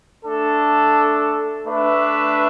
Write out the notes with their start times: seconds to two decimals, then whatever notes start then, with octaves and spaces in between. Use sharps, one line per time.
0.25 A3 D4 A4
1.67 A3 D4 B4 E5